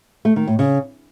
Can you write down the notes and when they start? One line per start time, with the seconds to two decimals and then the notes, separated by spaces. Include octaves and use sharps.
0.25 A3
0.36 D#3
0.48 A2
0.59 C#3